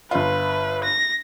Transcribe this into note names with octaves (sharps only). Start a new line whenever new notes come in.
G1 F4 B4
A#6